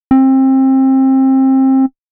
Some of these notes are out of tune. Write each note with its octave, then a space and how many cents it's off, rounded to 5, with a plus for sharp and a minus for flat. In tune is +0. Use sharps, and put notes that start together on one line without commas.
C4 +25